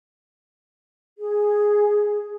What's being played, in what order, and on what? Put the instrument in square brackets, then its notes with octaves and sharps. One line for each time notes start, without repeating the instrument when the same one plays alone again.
[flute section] G#4